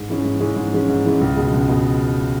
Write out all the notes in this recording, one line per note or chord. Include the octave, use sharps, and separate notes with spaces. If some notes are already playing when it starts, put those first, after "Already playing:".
Already playing: G#2
E3 G#3 C#4
G#2
E3 G#3 C#4
G#2
E3 G#3 C#4
G#2
E3 G#3 C#4
C#2
B2 G#3
C#2
B2 G#3